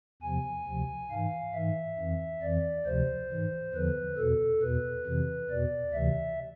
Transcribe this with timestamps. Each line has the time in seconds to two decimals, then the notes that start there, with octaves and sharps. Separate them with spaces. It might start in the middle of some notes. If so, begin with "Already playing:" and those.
0.23 E2 C3 F3 G#5
0.67 D2 C3 F3
1.11 G#2 E3 F5
1.54 G#2 E3 E5
1.99 F2 E3
2.42 F2 E3 D5
2.86 D2 C3 F3 C5
3.30 G#2 E3
3.74 E2 D3 F3 B4
4.18 E2 B2 A4
4.62 E2 B2 B4
5.05 F2 C3 E3
5.50 E2 B2 D5
5.93 D2 C3 E3 E5